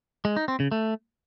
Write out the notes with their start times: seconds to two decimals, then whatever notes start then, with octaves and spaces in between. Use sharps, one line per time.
0.25 G#3
0.36 D#4
0.48 C4
0.60 C#3
0.72 A3